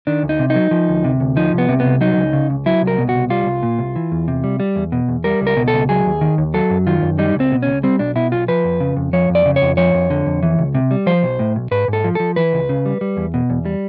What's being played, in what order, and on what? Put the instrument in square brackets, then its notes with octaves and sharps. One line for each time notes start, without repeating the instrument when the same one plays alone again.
[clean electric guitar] D#3 D4
D2
D#4
C3
D#4
F#3
F3
D2
C3
D2
F3 D#4
C2 B3
C3
B3
C2
F#3 D#4
C#2
C#3
C#2
F#3 E4
C2
A#4
B2
C2 F#4
G3 F4
C2
A#2
C2
E3
E2
C3
G3
G3
E2
B2
E2
G3 A#4
C#2
A#4
B2
A4
C#2
F#3 G#4
D#2
D#3
D#2
F#3 A4
F#2
D#3 F4
F#2
G3 D#4
C#2 C4
B2
C#2 C#4
G3 C4
B1 D4
B2 E4
B1 F4
F3 B4
F2
C#3
F2
F3 C#5
F2
D5
C#3
C#5
F2
F3 C#5
F2
D3
F2
E3
C#2
C3
G3
F3 C5
B1
A2
B1
G#2 B4
G#2
A4
F3
F3 A4
E3 B4
C#2
C#3
G3
G3
E2
B2
E2
G3